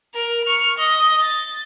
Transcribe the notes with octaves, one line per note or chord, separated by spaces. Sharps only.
A#4
C#6 F6
D#5
A6